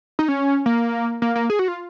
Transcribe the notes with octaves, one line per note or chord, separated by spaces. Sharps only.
D#4
C#4
A#3
A#3
A#3
G#4
F#4
F4